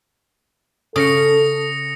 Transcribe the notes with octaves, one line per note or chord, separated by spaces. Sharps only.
C#3 A4 D#6 A#6 C#7